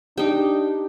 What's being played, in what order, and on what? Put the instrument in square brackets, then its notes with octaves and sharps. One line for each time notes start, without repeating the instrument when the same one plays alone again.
[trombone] D4 [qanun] D#4 G5 [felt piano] G4